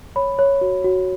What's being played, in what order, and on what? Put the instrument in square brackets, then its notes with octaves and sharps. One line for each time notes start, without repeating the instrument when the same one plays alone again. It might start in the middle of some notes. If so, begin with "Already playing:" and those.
[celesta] C#5 B5
C#5
F#4
F#4